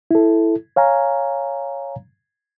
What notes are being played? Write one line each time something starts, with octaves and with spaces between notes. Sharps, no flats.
E4 A4
C#5 F5 G#5 A#5